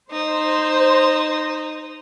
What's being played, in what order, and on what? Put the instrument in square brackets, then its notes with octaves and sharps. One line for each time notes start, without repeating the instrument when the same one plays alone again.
[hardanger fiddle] D#4 [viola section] C5